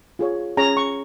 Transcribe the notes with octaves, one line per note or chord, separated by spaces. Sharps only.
F4 G#4 C#5
C#4 G#4 C#5 A#5
C#6